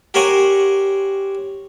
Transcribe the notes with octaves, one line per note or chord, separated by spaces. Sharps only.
G4 A#4 C5 C#5 F#5 G#5